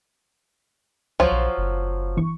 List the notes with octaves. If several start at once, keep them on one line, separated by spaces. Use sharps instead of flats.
C#2 F3 F#3 F4 C5
A#1
F#1
G1 E3 C#6